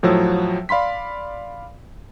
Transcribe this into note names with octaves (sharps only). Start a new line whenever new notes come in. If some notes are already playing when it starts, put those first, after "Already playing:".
A2 F3 F#3 E6
D5 F5 B5 C6 B6